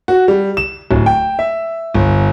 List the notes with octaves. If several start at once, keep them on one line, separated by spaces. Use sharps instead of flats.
F#4
G3
E7
D1
G5
E5
G1